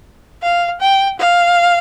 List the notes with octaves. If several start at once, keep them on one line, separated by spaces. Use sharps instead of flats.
F5
G5
F5